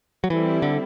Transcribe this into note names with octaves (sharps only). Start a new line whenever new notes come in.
F#3
E3 G3 C4 E4 A4
D3